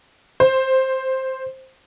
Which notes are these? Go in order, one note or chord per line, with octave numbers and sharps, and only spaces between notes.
C5